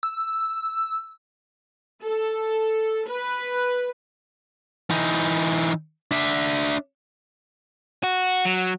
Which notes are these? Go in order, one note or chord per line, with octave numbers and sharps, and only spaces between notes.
E6
A4
B4
E3 D#4
D4 E5
F#4
F#3